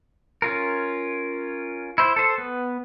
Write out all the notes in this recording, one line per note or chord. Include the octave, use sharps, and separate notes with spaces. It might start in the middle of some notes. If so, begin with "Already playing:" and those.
C#4 F4 A#4
E4 C5
A4 C5
B3